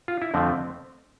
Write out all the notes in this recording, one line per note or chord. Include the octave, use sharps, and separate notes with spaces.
F4
E4
F2 D3 F3 A3 C4